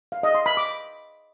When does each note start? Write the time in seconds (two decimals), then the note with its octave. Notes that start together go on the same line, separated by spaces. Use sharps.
0.12 F5
0.23 D#5
0.35 C6
0.46 B5
0.57 D6